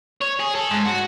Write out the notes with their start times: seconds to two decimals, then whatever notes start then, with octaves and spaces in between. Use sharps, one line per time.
0.22 C#5
0.40 G#4
0.55 A4
0.71 G#2
0.86 F#4